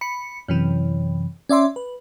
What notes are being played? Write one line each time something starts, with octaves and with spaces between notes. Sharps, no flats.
B5 C#7
F#2 C3 E3
C#4 D5 E5 C6 D6
B4